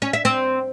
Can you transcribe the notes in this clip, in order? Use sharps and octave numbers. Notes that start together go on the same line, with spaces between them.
C#4
E5
C4